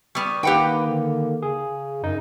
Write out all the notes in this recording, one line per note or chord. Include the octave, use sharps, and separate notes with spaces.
G3 B3 C#6
D#3 A#3 G4 B4 F#5 G5
D3
C#3 G#4
F#2 D#4